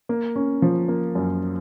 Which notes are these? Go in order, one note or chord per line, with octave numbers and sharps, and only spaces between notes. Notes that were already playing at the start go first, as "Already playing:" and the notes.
A#3
C#4
F3
A#3
F#2